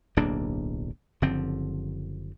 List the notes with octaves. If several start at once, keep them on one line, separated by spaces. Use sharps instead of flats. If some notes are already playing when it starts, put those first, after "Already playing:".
D1 B1 A#3 D4
F#1 D3 F3 C4